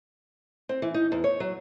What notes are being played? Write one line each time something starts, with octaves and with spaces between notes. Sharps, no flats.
C4
E3
D#4
E2
C#5
F#3